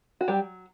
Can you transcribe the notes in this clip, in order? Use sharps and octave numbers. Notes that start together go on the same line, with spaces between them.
F#4
F#3 G3 G4